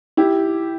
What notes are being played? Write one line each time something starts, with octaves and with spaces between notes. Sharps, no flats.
E4 G4